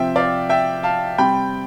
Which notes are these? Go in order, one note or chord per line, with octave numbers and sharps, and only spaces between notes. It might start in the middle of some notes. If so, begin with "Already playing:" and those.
Already playing: C3 F3 C4 E5 G5
D5 F5
E5 G5
F5 A5
C3 G3 C4 G5 B5